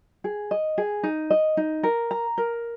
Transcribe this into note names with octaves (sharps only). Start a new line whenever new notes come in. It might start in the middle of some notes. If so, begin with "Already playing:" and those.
G#4
D#5
G#4
D#4
D#5
D#4
A#4
A#5
A#4